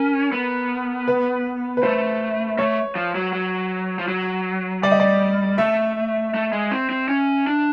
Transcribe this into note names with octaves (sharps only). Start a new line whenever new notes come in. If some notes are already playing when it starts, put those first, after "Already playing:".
Already playing: C#4 A#4
B3
B4
B4
A3 C5
A3 C#5
F3
F#3
F#3
F3
F#3
G3 D5
D#5
D5
A3 E5
A3
G#3
C4
C4
C#4
D4